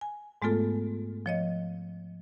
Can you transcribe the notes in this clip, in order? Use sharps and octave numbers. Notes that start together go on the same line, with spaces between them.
G#5
G#2 G#3 A3 B3 F4 A4
F3 C#5 D#5